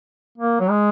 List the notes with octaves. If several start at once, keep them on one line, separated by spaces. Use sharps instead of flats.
A#3
F#3
G#3